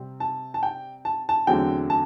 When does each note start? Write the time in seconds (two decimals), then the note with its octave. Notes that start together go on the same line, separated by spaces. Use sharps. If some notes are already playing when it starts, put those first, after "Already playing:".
Already playing: C3 G3 C4
0.20 A5
0.54 A5
0.63 G5
1.05 A5
1.29 A5
1.47 E2 D3 F#3 A3 C4 G5
1.90 A5